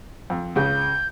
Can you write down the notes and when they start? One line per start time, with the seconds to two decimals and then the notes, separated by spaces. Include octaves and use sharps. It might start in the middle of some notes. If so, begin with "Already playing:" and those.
0.30 F2
0.56 C#2 C#3 G6